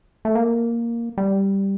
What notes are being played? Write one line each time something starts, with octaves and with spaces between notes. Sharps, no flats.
A3
A#3
G3